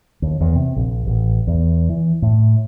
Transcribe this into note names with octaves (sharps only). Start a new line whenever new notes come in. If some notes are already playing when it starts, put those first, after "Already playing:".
D#2
E2
C3
A#1
A1
E2
E3
A2